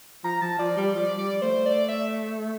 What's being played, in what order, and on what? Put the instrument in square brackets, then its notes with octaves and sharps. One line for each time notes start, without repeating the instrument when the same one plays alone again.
[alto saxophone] F3 [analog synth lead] A#5
[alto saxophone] F3 [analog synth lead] A5
[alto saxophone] F3 [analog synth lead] D5
[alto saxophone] G3 [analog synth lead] D5
[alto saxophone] F3 [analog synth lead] D5
[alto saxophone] G3 [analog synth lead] D5
[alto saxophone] A3 [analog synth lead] C5
[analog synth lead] D5
E5